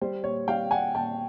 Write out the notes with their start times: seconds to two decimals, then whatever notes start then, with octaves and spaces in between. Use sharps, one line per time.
0.01 G3 C5
0.24 A#2 C#5
0.48 G3 F5 G5
0.71 G3 F#5 G#5
0.95 A#2 G5 A5